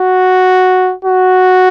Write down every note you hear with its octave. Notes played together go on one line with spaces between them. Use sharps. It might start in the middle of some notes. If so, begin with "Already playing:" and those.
Already playing: F#4
F#4